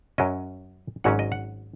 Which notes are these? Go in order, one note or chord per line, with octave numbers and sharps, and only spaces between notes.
F#2 F#3 C#4 D#5
G#1 G#2 F#3 C#4 F#5
D#5
F#5